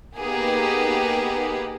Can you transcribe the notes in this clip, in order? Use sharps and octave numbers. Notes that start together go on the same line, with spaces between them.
A#3 B3 D#4 G4 G#4 B4